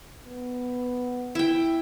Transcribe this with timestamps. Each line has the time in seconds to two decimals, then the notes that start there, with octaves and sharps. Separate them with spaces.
0.25 B3
1.35 E4 G5